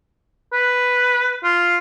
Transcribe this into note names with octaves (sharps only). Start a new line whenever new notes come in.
B4
F4